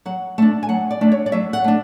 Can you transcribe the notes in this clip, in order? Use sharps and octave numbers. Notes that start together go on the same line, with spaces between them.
F#3 F#5
A3 D4 A5
G#5
F#3 F#5
D5
A3 D4
C#5
D5
F#3 E5
F#5
A3 D4